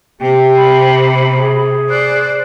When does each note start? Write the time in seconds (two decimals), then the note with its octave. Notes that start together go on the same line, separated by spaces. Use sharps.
0.21 C3 G4
0.57 B5
1.38 G#4
1.90 C5 D5 F#6